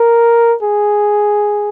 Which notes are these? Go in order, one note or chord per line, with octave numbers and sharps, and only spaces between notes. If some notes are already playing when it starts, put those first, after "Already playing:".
Already playing: A#4
G#4